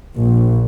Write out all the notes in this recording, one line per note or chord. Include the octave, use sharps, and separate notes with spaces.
A#1